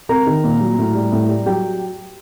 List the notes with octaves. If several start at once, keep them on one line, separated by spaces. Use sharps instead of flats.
C3 A#4 A#5
D#3
A#2
F#3
A2
G3
A2
G3
F#3 G4 G5